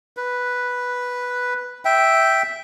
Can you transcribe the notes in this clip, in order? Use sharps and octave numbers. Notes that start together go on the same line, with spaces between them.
B4
E5 G5